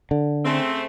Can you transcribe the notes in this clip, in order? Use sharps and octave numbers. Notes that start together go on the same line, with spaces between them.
D3
C#3 A3 C4